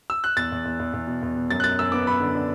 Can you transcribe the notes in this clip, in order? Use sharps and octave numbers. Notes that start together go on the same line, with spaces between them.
E6
F#6
E2 A6
E2
E2
E2
E2
B2
E2
B2
F#2 A6
F#6
F#2 A6
F#2 E6
B3 D6
F#2 B5
D3
D4